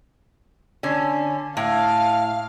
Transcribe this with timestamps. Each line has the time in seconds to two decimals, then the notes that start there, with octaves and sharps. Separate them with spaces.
0.83 D3 C#4
1.57 A2 F5